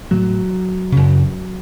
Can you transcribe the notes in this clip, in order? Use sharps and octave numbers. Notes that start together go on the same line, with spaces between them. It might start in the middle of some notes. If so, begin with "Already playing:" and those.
A2 F#3
F#2 C#3